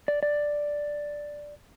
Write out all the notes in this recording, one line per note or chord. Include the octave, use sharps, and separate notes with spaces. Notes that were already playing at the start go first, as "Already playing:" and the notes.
D5
D5